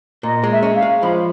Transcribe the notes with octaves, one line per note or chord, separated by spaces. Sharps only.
A#2 D#5
G#3
E5
C#4
F5
G#3
F3 B5